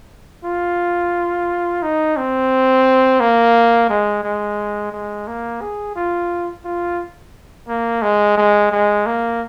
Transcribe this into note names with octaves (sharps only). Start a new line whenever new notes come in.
F4
D#4
C4
A#3
G#3
G#3
G#3
A#3
G#4
F4
F4
A#3
G#3
G#3
G#3
A#3